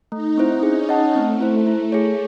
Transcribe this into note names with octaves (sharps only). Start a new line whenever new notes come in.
A3 D#4
C4 E4 C5
C#4 G#4
D#5 F#5 A5
A3 C4
E4 C5
E4
G#4 C#5